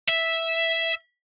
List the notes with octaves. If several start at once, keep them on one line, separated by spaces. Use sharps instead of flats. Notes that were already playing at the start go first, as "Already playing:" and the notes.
E5